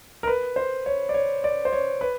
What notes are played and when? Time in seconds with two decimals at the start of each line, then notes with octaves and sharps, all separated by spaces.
0.23 A#4
0.27 B4
0.56 C5
0.86 C#5
1.09 D5
1.14 C#5
1.44 D5
1.65 C5
1.72 C#5
2.01 B4